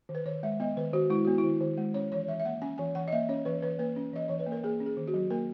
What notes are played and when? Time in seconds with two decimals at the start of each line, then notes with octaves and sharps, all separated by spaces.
0.09 D#3
0.15 B4
0.26 D#3 C#5
0.43 G#3 E5
0.60 B3 D#5
0.77 D#3 B4
0.93 D#3 F#4
1.10 G#3 E4
1.25 B3 F#4
1.38 E4
1.44 D#3
1.61 D#3
1.77 G#3
1.94 C#4 C#5
2.12 E3 C#5
2.28 E3 E5
2.40 E5
2.45 A#3 F#5
2.62 C#4 G#5
2.78 E3 G#5
2.95 E3 F#5
3.08 D#5
3.12 A#3 E5
3.29 C#4 C#5
3.45 E3 B4
3.62 E3 B4
3.79 A#3 B4
3.96 C#4
4.13 E3 D#5
4.28 E3 C#5
4.39 B4
4.46 A#3
4.52 A#4
4.63 A#3 G#4
4.80 C#4
4.86 G#4
4.97 D#3
5.08 F#4
5.14 F#3
5.30 A#3 A#4